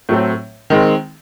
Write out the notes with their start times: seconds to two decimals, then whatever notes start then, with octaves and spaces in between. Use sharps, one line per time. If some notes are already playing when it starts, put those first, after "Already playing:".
0.09 A2 F#3 A3 C4
0.70 D#3 G#3 C4